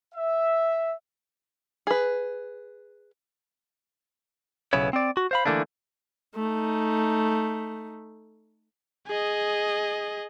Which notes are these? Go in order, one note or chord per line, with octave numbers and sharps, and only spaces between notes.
E5
G#4 B4
B1 C#3 B3 E4 C#5
C4 D5
F#4
C5 F5 B5
D3 E3 F3 A3 A#3 D4
A3 D#4
G#4 D#5